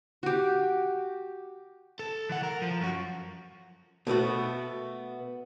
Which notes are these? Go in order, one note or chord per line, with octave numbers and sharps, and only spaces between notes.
F#4 G4
A4
E3 F#5
A#4
F3
F#2 F#4
B2 A3 B3 F#4